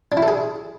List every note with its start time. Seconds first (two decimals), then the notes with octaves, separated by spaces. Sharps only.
0.12 D4
0.17 E4
0.23 A4
0.28 G#4